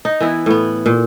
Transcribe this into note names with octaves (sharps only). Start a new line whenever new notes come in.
D#4
E3 B3 E4
A2 B3
A#2